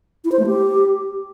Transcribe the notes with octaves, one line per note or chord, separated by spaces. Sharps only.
E4
C5
A3
G4